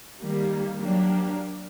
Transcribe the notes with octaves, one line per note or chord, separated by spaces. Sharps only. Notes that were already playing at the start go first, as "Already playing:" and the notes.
D#3 G3 A#3
F#3 A#3 D4 G4